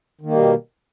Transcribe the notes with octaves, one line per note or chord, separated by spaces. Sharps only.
B2 D#3 G3 A#3